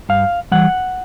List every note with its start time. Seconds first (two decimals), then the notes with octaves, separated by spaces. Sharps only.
0.09 G2 F5
0.52 E3 G3 F#5